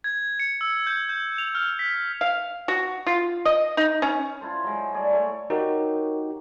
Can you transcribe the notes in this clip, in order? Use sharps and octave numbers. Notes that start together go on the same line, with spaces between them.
G#6
C#7
E6
G6
G6
F7
F6
B6
F5
F#4
F4
D#5
D#4
C#4
E4 F4 A4 C5
F#3 G#3
G3 A3 G#4 D5
A3 C#6
D#4 F#4 G4 A#4 C#5